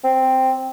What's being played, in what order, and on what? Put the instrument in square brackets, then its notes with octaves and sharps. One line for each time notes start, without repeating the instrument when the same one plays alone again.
[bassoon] C4